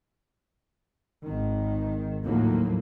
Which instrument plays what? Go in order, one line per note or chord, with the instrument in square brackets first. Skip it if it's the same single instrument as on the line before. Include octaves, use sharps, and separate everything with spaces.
[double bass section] G#1 D#3
D#2 A2 F3 F#3 A#3